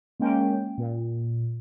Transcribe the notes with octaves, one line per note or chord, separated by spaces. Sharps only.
G#3 A#3 C#4 G5
A#2